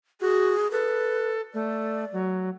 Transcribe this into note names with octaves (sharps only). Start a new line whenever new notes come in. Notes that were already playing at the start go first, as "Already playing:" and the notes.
F#4 G#4
A4 B4
A3 D5
F#3